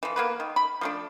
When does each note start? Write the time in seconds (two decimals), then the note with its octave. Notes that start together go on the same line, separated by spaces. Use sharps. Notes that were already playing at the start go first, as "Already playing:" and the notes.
0.03 E3 F3
0.16 A#3 B3 B4
0.40 D#3
0.56 B5
0.81 F3 A3 D4